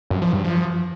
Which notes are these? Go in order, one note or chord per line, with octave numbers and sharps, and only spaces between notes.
F#2
F3
G2
F3